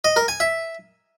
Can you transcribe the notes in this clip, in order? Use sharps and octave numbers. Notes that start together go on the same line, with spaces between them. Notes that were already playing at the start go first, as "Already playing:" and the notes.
D#5
A#4
G#5
E5